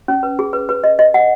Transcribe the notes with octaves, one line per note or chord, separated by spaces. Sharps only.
C#4
B4
G#4
B4
B4
D#5
D#5
F#5